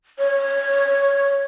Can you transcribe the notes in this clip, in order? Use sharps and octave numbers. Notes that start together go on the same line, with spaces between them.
C#5